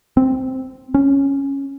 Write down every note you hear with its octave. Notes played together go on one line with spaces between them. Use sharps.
C4
C#4